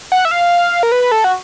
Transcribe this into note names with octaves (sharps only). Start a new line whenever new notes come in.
F#5
E5
F5
A#4
B4
A4
F#4